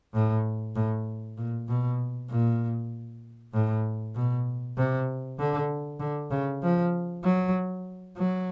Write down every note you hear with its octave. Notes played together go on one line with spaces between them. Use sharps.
A2
A2
A#2
B2
A#2
A2
B2
C3
D3
D3
C#3
F3
F#3
F#3